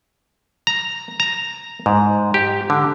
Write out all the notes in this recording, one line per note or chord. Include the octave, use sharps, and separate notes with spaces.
A#5
A#5
G#2
G4
D3